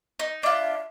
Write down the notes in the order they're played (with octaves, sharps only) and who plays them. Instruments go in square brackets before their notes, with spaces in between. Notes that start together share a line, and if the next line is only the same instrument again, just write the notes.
[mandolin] D#4
[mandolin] D4 F4 [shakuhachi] E5